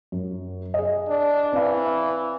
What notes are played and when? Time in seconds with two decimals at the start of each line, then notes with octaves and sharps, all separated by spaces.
0.12 F#2
0.74 G#4 D#5
1.08 D4
1.53 E3 C4 F5